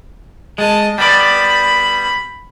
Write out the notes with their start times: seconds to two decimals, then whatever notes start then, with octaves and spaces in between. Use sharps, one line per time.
0.58 G#3 D#5 A5
0.98 G3 B3 D5 B5